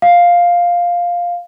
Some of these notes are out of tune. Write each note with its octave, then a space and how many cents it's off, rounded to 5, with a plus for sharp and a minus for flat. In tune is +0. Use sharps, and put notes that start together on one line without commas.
F5 +5